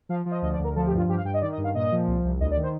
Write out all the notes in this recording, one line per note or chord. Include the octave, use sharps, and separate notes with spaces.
F3 F5
F3
D#5
D2 D#5
D5
D2 A#4
F3 A4
G4
G2 F4
G2 G4
F5
G2 G5
D#5
D#3 D5
D#5
G2
F5
A#2 D#5
F3
C2
C2
D2 D#5
D5
D#3
C5